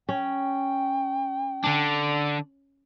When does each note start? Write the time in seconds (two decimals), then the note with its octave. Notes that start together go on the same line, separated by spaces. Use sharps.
0.09 C#4 G5
1.64 D3 D4